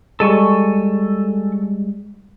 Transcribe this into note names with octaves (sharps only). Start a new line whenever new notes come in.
G3 G#3 A4 G#5 C#6